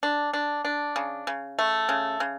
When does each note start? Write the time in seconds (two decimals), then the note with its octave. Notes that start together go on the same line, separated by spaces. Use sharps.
0.03 D4
0.33 D4
0.65 D4
0.96 C#3
1.27 C#3
1.59 A3
1.89 C#3
2.20 C#3